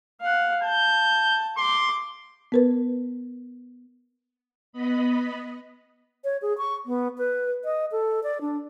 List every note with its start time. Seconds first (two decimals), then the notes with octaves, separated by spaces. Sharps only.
0.21 F5 F#5
0.63 A5 G6
1.58 C6 D6
2.52 B3 A#4 B4
4.72 B3 D#5 B5
6.24 C#5
6.42 G#4
6.58 C#6
6.86 B3
7.18 B4
7.65 D#5
7.92 A4
8.23 D5
8.41 D4